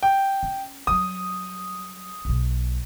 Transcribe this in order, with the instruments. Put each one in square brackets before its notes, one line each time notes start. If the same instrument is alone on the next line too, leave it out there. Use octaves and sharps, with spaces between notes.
[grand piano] G5
[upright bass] C#4
[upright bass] F#3 G3 [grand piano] D#6
[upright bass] B1 B2